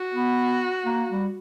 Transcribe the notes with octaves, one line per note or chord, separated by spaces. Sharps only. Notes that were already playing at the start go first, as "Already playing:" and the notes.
Already playing: F#4
B3
A#3
G3